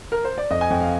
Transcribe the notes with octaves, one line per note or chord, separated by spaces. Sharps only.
A#4
C5
D5
F2 D#5
G#5
F2 G5
F5